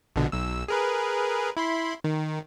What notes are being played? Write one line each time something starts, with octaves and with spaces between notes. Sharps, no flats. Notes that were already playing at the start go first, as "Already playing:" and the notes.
A#1 B2 D3
B1 E6
G#4 A#4 B4
E4 B5 C6
D#3